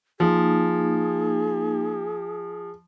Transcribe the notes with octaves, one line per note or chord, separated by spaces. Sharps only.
F3 A#3 D#4 G#4